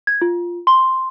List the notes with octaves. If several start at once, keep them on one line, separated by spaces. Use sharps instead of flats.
G#6
F4
C6